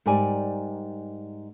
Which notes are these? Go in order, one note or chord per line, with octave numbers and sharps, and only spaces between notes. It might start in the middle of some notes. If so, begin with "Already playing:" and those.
G#2 G3 A#4 D5 G#5